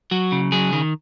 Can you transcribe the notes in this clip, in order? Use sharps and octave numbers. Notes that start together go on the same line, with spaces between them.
F#3 F#4
C#3
F#3 G#4
D#3